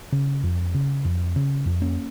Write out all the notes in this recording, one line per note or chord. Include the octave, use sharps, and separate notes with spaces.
C#3
F2
C#3
F2
C#3
F2
A#3 C#4